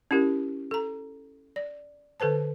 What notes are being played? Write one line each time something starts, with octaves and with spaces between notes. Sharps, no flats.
C#4 E4 G4 A#4
A4 A#5
D5
D3 A4 B4 C5 A5